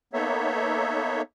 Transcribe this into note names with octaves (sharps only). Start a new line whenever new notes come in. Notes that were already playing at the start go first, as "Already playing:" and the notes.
A#3 B3 D#4 A4 C#5 E5